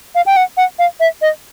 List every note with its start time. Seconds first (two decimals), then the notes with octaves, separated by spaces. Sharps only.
0.15 F5
0.26 G5
0.36 F#5
0.57 F#5
0.79 F5
1.00 E5
1.22 D#5